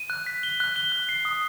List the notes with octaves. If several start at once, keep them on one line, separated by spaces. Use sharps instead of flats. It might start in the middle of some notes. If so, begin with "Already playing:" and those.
Already playing: D#7
F#6
B6
G7
F#6
G7
F#6
C7
D#6